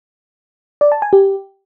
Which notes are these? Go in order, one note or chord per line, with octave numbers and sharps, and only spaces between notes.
D5
A5
G#5
G4